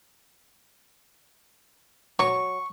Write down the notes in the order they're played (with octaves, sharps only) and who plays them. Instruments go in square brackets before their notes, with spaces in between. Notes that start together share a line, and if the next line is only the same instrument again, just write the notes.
[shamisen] F#3 [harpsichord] C#6